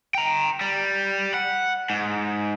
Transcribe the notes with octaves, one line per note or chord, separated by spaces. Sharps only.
G5 A#5
G3
F#5
G#2